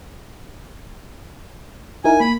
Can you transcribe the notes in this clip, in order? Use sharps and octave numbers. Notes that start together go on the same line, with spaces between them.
D#4 E4 A#4 G#5
A#3 B5